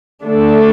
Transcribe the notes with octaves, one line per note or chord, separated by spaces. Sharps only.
D3 A3 D4 A4